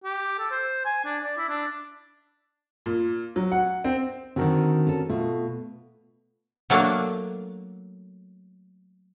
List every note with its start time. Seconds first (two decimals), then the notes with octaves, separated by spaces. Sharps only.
0.04 G4
0.39 A4
0.51 C5
0.85 G#5
1.05 D4
1.23 D5
1.38 E4
1.49 D4
2.86 A#2
3.36 F#3
3.52 F#5
3.84 C4
4.36 D3 D#3 C4 F#4 A#4
4.87 C#4 A4
5.10 B2 A3 F4 A4
6.70 F#3 A3 A#3 D4